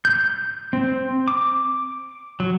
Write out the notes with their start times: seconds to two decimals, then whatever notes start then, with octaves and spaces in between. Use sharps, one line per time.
0.05 G6
0.73 C4
1.28 D6
2.40 F#3